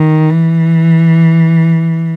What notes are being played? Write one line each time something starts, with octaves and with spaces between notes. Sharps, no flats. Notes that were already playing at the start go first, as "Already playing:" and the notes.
Already playing: D#3
E3